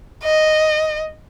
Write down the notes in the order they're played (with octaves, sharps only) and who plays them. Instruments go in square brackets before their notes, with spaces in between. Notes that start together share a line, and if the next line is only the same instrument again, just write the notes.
[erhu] D#5